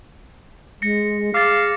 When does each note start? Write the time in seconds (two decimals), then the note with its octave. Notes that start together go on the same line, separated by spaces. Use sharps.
0.82 G#3 A#6 C#7
1.34 G#4 F5 D6 A6